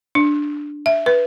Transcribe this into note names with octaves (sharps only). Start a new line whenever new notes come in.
D4
E5
B4